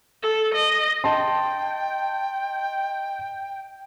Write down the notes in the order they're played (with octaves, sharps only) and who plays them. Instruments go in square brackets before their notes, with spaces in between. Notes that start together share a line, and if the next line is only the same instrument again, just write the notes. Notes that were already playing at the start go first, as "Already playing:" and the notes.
[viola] A4
D#5
[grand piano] D#5 A5 C6 [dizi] G5